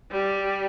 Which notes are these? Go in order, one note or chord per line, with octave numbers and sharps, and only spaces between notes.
G3